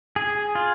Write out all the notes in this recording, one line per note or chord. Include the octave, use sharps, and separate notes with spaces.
G#4
F4